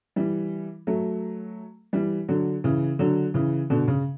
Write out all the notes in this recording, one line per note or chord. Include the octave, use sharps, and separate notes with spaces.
E3 G3
F#3 A3
E3 G3
D3 F#3
C#3 E3
D3 F#3
C#3 E3
B2 D3
C#3